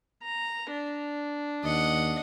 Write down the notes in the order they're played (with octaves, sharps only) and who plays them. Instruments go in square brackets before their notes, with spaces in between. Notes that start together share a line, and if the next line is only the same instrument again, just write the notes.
[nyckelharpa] A#5
D4
[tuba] D#2 [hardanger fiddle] D#5 F#5